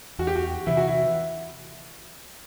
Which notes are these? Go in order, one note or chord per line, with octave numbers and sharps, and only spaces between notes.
E2 F#4
G4
F#4
C3 E3 E4
F#4
E4